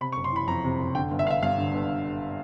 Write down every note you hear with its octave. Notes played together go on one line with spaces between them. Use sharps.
C3 B5
C#6
F#1
C6
E3 B5
F2 A#5
C3
F#1
D3 G5
G1
E5
G1 E5 F5
G2 F5
D3
G1